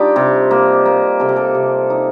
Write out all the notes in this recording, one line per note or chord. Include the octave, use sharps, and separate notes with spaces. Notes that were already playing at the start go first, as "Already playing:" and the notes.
Already playing: G3 D4 D#4 F4 G4
C3
A#3
A#3
C3 A4
G4
A4
C3
D#4